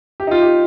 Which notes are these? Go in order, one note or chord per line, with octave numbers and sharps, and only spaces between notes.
G4
D#4
F4
G4